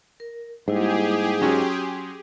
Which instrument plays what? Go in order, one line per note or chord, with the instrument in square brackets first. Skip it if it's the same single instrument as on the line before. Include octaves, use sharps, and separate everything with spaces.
[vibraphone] A#4
[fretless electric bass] G#2 [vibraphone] G3 A#3 E4 [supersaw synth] G4 G#4
[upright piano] F#3 C#4 [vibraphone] C6